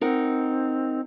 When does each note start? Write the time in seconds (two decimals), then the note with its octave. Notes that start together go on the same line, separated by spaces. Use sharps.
0.01 C4 D#4 A#4 F#5